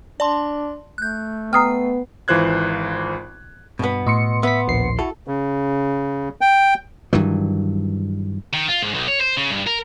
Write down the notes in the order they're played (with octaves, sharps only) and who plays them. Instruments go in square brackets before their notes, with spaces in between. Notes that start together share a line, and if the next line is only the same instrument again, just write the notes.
[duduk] D4 [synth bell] D5 A5 C6
[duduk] A3 [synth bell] F#6 G6
[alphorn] B3 [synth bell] G5 C7 [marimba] A#5 D#6 F6
[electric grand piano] G#1 E3 F4 C5 F#6 G#6
[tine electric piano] G2 [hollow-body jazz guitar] B2 B3
[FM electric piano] A2 C6 C#7 [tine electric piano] D#5
[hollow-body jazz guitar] B3 [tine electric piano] E5 B6
[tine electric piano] A#1 D#2 C7
[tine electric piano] E4 F#4 [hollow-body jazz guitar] A4
[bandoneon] C#3
G5
[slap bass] G2 D#3 E3 F#3
[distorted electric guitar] D#3
F4
G#2
B1
C#5
C5
C#3
G2
A#4